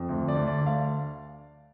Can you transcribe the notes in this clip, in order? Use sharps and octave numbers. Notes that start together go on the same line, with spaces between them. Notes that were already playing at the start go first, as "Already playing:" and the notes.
Already playing: F2
D2
D5
D2
D5
D2
F5